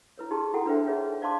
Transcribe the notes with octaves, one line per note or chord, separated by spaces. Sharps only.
E4 B4 C#5
D#4 G4 G#4 A5 C6
E4 F#4 A4 F#5 G5
D4 B4 C5 E5 G5
D#4 G#4 B4 C#5 E5
C5 D5 F5 A5 C6 D6